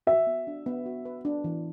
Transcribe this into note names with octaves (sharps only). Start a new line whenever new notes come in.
F#4 E5
B3
D4
B3
F#4
B4
D4
E3